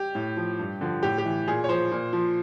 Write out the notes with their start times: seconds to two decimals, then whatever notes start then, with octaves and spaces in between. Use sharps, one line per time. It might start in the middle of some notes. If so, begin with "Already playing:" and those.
Already playing: G4
0.15 A2
0.37 F3
0.59 G2
0.81 D3 F3
1.03 A2 G4
1.18 G4
1.25 E3
1.47 A#2 G#4
1.64 C#5
1.69 F3 C5
1.92 A#2
2.13 F3